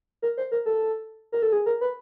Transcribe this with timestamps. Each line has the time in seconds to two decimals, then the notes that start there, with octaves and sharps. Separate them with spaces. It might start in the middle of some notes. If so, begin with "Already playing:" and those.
0.22 A#4
0.37 C5
0.52 A#4
0.66 A4
1.32 A#4
1.42 A4
1.52 G#4
1.66 A#4
1.81 B4